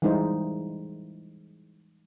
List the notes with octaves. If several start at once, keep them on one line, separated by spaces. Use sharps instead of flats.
E3 G3 G#3 D#4 E4 C5